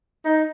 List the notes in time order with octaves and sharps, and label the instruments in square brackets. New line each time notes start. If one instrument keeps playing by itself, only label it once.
[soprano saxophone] D#4